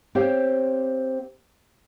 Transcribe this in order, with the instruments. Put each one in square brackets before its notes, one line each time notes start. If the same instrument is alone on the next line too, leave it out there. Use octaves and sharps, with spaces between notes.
[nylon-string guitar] C4 G4 C5 C#5 F5